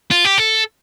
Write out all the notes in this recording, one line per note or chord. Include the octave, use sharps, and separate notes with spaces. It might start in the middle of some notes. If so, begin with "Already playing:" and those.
F4
G4
A4